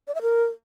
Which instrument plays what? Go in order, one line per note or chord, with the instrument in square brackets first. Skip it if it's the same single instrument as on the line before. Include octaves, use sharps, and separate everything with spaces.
[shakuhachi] D5
E5
A#4